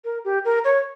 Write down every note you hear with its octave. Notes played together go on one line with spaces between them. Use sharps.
A#4
G4
A#4
C#5